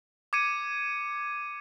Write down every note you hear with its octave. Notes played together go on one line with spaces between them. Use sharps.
D6 G#6 C#7 D#7